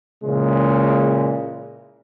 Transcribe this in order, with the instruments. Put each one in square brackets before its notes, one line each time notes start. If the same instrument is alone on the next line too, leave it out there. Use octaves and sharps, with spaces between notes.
[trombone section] A#2 C#3 E3 G#3